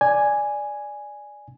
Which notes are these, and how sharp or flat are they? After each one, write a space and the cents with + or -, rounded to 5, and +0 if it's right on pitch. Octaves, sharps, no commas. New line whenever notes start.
D5 +0 G#5 +0